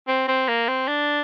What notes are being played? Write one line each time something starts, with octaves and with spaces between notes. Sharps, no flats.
C4
C4
A#3
C4
D4